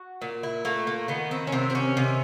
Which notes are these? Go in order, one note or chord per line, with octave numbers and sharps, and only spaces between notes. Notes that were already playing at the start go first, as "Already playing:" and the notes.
Already playing: F#4
A#2
E4
A3 A#3
A#3
D#3 B3
C4
C#4
C3 C4
C4
C#4
C3